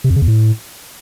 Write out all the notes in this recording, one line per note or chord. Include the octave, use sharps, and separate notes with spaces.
C3
F2
C#3
E2
A2